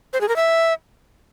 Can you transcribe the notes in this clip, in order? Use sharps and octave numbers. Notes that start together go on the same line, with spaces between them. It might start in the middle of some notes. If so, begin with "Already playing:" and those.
C5
G#4
A#4
E5